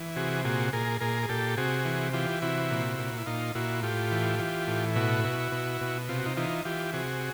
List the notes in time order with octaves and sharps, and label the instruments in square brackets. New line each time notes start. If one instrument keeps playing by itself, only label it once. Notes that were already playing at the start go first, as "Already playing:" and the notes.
Already playing: [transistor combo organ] E3
C3 F#4 G#4
A#2 F#4 G#4
A#2 G#4 A#4
A#2 G#4 A#4
G#4
A#2 G4 A4
C3 F#4 G#4
E3
E3 F4 G4
C3 E4 F#4
A#2
A#2
E4
A#2 D#4 F4
A#2 E4 F#4
A2 F4 G4
E3
E3
A2
B2 E4 F#4
B2
B2
B2
C3 F4
F#4
D#4 F4
E3 D#4 F4
E3 F4 G4
C3 F#4 G#4